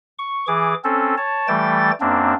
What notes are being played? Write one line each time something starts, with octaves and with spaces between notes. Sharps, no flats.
C#6
E3 G#4 D6
C4 C#4 A4
C#5 A5
E3 G3 A3 G5 A6
F#2 A#3 C4 D4